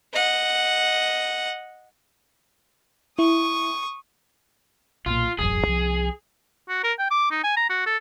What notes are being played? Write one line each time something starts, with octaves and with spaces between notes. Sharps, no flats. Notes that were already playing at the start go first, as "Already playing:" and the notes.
D#5 F#5
E4 C#6 D#6
B1 A#2 F4
E1 A1 F#2 G#4
C2 F3
F#4
A#4
G5
D6
D#4
G#5
A#5
F#4
A4